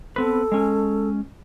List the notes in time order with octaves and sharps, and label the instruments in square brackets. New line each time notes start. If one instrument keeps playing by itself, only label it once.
[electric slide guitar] B3 C4 B4 [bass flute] A4
[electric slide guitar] G#3 C#4